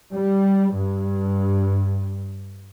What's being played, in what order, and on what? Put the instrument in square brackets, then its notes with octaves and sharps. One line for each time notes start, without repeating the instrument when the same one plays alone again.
[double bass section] G3
G2